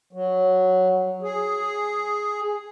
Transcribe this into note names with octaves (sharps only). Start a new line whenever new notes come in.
F#3
G#4